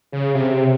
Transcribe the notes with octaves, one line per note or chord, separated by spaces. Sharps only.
C#3
C3